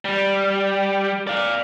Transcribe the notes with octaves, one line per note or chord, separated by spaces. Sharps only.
G3
D5 F5